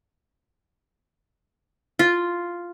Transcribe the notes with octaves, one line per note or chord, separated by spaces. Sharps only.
F4